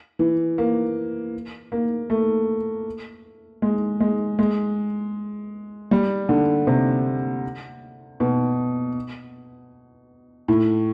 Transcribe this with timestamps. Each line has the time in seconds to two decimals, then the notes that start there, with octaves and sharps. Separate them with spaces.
0.19 E3
0.58 A#3
1.72 A#3
2.10 A3
3.62 G#3
4.00 G#3
4.39 G#3
5.91 G3
6.29 D3
6.67 C3
8.20 B2
10.48 A2